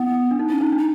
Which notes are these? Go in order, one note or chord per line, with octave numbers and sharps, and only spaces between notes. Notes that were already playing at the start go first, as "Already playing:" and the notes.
Already playing: B3 E4
D4
D#4
C#4 E4
D#4
D4
D#4